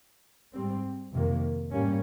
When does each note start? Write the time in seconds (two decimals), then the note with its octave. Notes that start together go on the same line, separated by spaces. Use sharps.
0.52 G#2 G3 C4
1.12 F2 C3 D#3 A#3
1.71 G#2 G3 A#3 C#4